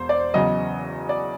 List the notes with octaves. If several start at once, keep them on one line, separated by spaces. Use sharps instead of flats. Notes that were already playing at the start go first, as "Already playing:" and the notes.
Already playing: E1 C5
D5
E2 C#3 F#3 D#5
D5